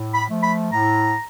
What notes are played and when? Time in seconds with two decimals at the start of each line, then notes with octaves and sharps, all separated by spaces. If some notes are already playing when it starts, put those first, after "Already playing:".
Already playing: A2
0.14 B5
0.28 F3 A3
0.43 B5
0.72 A2 A#5